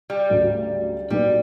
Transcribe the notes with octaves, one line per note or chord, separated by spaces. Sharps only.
G3
D2 C#3 F#3
B1 A#2 F#3 G3 B3 D4